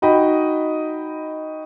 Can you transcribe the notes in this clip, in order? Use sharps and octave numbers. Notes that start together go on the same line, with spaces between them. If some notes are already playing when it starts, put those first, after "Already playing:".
D#4 F#4 D#5 G5 B5